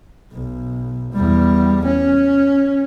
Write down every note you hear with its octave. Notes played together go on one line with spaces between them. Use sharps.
B1
E2 G3
C#4